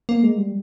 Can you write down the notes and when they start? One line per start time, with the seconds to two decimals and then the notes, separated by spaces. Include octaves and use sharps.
0.09 A#3
0.23 G#3
0.38 G3